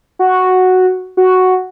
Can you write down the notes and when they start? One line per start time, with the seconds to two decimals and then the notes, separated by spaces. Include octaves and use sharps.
0.19 F#4
1.17 F#4